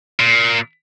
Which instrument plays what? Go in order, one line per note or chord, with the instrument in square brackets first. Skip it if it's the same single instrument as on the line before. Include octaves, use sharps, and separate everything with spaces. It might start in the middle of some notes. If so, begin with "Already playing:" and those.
[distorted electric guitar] A#2